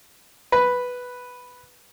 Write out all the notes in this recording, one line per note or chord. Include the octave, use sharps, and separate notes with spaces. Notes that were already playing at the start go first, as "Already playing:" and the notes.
B4